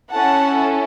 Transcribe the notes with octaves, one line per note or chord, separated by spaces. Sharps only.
C#4 E4 A4 F#5 A5